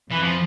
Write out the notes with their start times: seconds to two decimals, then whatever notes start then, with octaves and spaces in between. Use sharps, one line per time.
0.11 F2 E3
0.23 F3